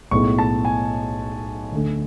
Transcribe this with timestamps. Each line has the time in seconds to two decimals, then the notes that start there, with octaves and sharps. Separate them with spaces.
0.11 B1 A2 G#3 B3 C#6
0.39 A5
0.65 G#5
1.72 D2 D3 A3